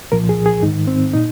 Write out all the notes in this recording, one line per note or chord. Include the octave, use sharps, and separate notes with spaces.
C2 A#2 F3 A#4
G#4
G#4
G#2 D#3 D#4
C4
A#2 D#4